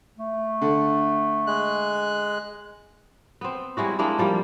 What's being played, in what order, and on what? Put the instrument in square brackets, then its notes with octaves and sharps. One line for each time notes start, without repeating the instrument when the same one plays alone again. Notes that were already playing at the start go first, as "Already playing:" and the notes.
[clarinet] A3
[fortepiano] D3
[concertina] G#3 F#6
[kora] B3 C4
G3 G#3 E4 F#4
G#3 A#3 D4 E4
F3 G3 A#3